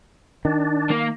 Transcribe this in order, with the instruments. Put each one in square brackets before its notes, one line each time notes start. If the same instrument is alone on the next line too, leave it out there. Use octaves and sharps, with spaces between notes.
[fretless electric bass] D#3 [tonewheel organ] D4
[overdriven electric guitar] A#3